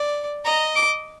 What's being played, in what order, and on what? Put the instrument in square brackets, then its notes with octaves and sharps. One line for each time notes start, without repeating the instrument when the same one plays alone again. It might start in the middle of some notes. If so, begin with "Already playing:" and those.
Already playing: [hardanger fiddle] D5
[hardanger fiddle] D#5 [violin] A#5
[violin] D6